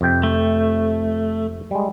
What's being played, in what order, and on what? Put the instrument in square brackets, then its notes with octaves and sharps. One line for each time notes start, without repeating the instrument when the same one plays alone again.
[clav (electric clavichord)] F2 C3 G5
[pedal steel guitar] A3
[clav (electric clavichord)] G3 G#3